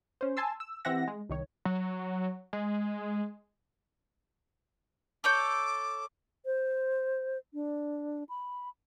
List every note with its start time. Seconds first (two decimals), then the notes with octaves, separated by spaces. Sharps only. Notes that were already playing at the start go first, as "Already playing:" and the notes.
0.21 C#4 C5
0.37 G#5 A5 C6 E6
0.60 E6
0.85 E3 C4 G4 E5 F#5 A#6
1.08 G#3
1.29 C2 D#3 C#5
1.65 F#3
2.53 G#3
5.24 A4 C#5 D6 G6
6.45 C5
7.54 D4
8.29 B5